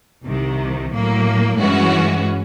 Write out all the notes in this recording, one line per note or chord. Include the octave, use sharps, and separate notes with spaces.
C2 C3 D#3
A2 F#3 A#3
G2 E3 G#3 C#4 F#4